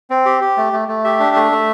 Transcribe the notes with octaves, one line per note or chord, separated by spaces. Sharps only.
C4
G4
G4
A3
A3
A3
G4 E5
D4
A3
A3